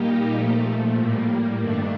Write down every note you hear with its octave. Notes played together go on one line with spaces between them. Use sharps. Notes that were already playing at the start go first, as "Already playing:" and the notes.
Already playing: A#2 G3 A#3 D#4 G4
A#2 F3 A3
A2 G3 A#3
G2 D#3 A3 D4